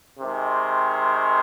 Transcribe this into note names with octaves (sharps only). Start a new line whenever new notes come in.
C3 D#3 G#3